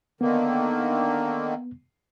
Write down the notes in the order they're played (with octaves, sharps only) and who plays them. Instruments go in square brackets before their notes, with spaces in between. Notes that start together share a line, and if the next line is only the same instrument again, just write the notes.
[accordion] D3 D#3 A#3 [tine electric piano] B3